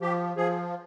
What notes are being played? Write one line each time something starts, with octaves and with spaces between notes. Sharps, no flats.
F3 G4
F3 G#4